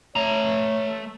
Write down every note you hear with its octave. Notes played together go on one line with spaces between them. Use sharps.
A3 C#5 A#5